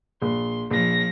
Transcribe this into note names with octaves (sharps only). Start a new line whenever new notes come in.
A#1 C6
A#1 F3 A#6